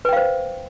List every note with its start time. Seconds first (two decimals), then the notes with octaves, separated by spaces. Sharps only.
0.05 B4
0.09 G5
0.13 F5
0.17 C5